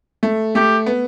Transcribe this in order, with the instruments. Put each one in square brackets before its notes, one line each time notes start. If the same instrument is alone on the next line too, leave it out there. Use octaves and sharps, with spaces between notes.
[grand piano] A3
[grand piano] A3 [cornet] G4
[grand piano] B3